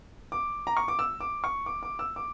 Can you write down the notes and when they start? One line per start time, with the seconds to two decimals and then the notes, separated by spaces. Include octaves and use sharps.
0.32 D6
0.67 A#5
0.77 C#6
0.88 D6
0.99 E6
1.20 D6
1.44 C#6
1.66 D6
1.83 D6
1.99 E6
2.16 D6